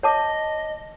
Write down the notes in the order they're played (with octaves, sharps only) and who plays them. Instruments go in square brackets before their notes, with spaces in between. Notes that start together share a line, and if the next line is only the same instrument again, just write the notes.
[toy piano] C#5 A5 D6 [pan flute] D#5